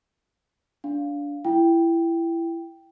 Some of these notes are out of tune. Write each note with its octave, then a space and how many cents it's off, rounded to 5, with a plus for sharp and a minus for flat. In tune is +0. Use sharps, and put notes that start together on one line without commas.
D4 -20 F5 +0
E4 +20 G5 +0